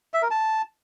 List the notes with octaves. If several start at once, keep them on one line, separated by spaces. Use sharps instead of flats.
E5
A#4
A5